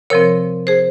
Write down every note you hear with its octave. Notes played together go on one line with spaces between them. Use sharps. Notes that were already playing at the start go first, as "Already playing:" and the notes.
C3 F3 C4 A#4 C#5
G#4 C5